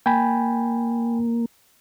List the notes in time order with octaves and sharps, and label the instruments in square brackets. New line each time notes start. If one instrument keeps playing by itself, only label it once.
[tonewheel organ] A#3 [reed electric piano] G5 G#5 B5